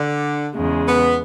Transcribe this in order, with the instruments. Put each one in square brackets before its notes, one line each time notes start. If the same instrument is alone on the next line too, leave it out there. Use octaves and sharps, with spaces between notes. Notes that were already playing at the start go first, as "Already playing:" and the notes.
Already playing: [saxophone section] D3
[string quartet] E2 C#3 G#3
[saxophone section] B3